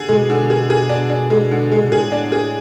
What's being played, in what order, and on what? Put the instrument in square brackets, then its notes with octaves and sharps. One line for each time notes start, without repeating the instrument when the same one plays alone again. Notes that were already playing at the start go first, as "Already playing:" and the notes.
Already playing: [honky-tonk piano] D3 G#4
[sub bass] B2 [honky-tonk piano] G#3
[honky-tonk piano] D3
G#4
G#4
D4
D4
G#3
D3
G#3
[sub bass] B2
[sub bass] A2 [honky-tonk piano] G#4
[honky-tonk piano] D4
G#4